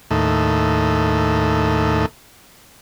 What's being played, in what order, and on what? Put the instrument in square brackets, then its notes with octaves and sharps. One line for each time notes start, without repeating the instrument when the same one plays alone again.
[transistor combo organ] D#2 A2